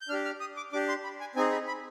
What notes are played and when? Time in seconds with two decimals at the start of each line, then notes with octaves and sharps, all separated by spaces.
0.01 G6
0.09 D4 F6
0.13 G4
0.25 F6
0.40 D#6
0.57 D6
0.73 D4 D6
0.75 G4
0.88 C6
1.04 B5
1.20 G#5
1.35 C4 D#4 G#4 G#5
1.52 B5
1.68 B5